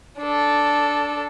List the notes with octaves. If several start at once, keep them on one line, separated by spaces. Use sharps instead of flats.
D4 A4